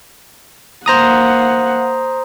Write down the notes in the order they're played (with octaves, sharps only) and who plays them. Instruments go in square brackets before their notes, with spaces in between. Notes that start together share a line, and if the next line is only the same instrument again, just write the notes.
[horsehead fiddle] A#3 F#5 [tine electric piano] C5 A#5 D#6